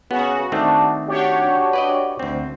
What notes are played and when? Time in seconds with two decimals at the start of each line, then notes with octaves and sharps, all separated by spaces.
0.11 C#3 B3 F#4
0.52 D#3 A3 C4 D4
1.08 D4 F#4 G4 C#5
1.73 B4 D5 D#5
2.19 D2 C4